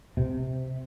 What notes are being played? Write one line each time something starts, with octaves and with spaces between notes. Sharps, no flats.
C3